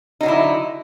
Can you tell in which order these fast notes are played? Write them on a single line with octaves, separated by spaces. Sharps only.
D#4 F#3 D3 E4